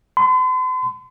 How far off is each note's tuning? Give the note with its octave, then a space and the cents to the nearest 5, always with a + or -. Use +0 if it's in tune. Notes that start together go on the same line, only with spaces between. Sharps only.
C6 -45